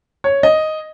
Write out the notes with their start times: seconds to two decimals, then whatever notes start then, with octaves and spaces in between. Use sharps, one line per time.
0.24 C#5
0.43 D#5